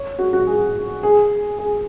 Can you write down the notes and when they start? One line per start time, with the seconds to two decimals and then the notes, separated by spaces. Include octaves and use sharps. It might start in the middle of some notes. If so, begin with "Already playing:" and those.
Already playing: C#5
0.19 F#4
0.33 F#4
0.47 G#4
1.03 G#4
1.59 G#4